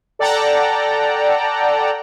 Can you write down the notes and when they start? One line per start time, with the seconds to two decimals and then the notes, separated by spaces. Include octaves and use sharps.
0.19 A4 D5 F#5 G5 A5 A#5